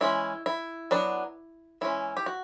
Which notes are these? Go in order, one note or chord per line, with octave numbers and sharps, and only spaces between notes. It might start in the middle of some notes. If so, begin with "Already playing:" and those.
E3 G#3 C#4 E4
E4
F#3 B3 D4
E3 G#3 C#4 E4
G4
F#4